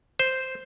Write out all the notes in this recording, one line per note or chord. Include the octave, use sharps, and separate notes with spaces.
C5